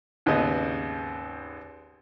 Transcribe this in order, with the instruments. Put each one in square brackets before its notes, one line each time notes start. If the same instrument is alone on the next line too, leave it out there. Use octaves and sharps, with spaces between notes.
[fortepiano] G#1 D#2 C#3 B3 D#5